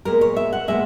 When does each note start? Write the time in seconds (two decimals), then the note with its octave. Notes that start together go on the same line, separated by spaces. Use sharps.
0.05 A#2 G#3 B3 A#4
0.21 C#5
0.36 E5
0.53 F#5
0.68 A#2 G#3 B3 E5